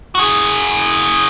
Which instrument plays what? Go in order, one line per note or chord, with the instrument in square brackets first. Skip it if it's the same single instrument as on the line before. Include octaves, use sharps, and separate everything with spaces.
[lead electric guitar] F#4 G#4